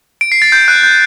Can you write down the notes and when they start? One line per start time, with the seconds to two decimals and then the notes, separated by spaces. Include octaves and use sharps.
0.21 D7
0.32 C7
0.42 A6
0.52 G6
0.68 F#6
0.83 G6